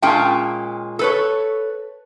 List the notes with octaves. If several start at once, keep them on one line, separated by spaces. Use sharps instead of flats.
A#2 G#3 C#4 F4 G5 A5
A4 B4 C#5